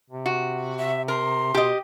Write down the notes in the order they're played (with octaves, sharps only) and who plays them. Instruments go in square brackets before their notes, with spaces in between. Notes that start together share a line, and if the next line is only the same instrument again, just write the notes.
[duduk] C3
[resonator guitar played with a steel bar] F#4
[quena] E5
[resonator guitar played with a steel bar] A#4 [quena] C6
[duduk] B2 [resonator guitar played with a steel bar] G4 D#5